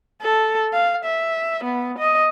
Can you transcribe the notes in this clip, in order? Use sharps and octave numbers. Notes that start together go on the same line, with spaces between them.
A4
F5
E5
B3
D#5